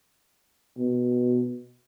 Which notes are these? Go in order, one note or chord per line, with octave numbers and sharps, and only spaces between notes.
B2